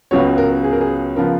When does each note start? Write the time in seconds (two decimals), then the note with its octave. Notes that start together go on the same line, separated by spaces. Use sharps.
0.11 C#2 C#3 F#3 B3 C#5
0.38 A#4
0.64 G#4
0.72 A#4
0.81 G#4
1.17 C#3 F3 B3 A#4